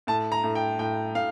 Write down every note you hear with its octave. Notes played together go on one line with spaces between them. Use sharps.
A2 A5
A#5
A2
G5
A2 G5
A2 F5